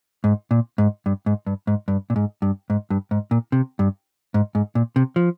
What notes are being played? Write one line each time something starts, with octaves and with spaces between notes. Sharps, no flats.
G#2
A#2
G#2
G2
G#2
G2
G#2
G2
A#2
G#2
G2
G#2
G2
G#2
A#2
C3
G2
G#2
G#2
A#2
C3
F3